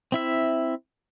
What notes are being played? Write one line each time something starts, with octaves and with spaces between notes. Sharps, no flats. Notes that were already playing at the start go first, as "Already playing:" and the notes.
C4 E4 E5